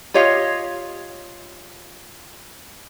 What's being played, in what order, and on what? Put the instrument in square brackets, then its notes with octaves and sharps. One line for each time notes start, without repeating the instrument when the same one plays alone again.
[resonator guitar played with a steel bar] F4 G4 C#5 D#5 F5